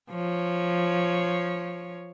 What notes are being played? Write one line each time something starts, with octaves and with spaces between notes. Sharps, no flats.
F3 C#5